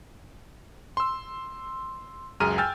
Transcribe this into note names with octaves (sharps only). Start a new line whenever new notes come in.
C6 E6
C#2 F#2 G#4 A#5 F6 D#7
G5 G#5 E6 F6 G6 A6